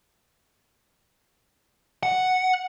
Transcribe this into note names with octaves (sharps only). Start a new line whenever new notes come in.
F#5